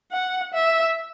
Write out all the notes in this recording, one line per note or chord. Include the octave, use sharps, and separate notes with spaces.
F#5
E5